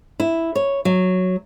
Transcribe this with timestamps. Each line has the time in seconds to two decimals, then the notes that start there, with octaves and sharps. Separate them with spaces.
0.20 E4
0.55 C#5
0.85 F#3